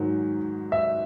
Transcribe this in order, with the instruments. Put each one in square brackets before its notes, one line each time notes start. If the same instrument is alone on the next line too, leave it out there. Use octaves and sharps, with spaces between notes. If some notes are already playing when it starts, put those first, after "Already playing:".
Already playing: [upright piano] G#2 D#3 F#3
E5